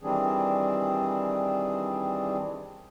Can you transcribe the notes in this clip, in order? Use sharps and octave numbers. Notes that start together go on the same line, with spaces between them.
D#3 E3 G3 C4 D4 G#4